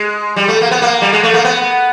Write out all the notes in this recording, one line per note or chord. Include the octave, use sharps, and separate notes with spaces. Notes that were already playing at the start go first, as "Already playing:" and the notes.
Already playing: G#3
G3
A3
A#3
B3
A#3
G3
G#3
A3
A#3
B3